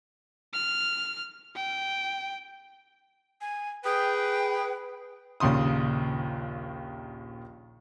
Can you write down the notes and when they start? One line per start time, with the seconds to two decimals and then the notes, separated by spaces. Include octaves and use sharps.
0.54 F6
1.55 G5
3.41 G#5
3.84 G#4 B4 G5
5.40 A#1 D#2 C#3 C6 D#6